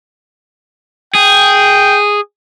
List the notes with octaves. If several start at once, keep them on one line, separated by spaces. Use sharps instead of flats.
G#4 G5